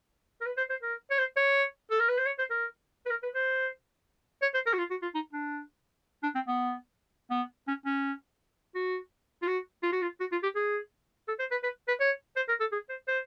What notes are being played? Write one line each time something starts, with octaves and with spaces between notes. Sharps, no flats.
A#4
B4
C5
C5
A#4
C#5
C5
C#5
A4
A#4
B4
C5
C#5
C5
A#4
B4
A#4
B4
C5
C#5
C5
A#4
F#4
F4
F#4
F4
D#4
D4
D4
C4
B3
B3
C#4
C#4
F#4
F4
F#4
F4
F#4
F4
F#4
F4
G4
G#4
A4
C5
B4
B4
B4
C#5
C5
A#4
A4
G#4
C5
C5